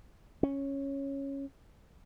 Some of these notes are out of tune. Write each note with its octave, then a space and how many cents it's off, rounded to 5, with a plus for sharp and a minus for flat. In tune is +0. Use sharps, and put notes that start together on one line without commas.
C#4 -5